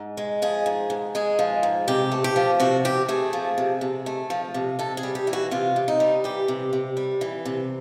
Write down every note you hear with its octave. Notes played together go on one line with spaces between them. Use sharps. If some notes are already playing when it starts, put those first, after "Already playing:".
Already playing: G#2
G#3
F3 G#4
G#2
G#2
G#3 G#4
F3
G#2
C3 G4
A3
G4
F3
C3 F#4
C3 G4
A3 G#4
F3
C3
C3
A3
F3
C3
C3 A4
G#4
G3
G4
E3
F#4
C3 F4
C3
D#4
G3
E3 G4
C3
C3
G3
E3
C3